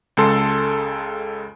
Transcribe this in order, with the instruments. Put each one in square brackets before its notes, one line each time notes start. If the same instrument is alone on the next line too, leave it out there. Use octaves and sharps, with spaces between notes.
[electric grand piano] C#2 C#3 G#3 A4 C6